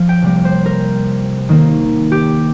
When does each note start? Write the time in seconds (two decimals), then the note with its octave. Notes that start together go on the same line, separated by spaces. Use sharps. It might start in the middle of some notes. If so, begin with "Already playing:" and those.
Already playing: F3 F5
0.09 G5
0.22 C3 G3 A#3 G5
0.45 C5
0.66 A#4
1.49 D#3 A#3
2.12 G4